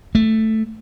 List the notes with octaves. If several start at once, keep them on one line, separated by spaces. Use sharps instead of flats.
A3